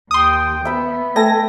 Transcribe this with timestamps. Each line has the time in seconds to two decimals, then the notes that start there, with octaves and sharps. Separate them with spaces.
0.11 D#2 G5 C6 D#6
0.65 B3 E5 B5
1.16 A3 A4 G5 G#5 A#6